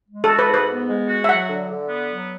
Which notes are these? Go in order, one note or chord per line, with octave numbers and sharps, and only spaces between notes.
G#3
F#4 A4
B4
G#2 B4
B3
G#3
F#4
E5
F#3 F#5
D3
D3
B3
F#3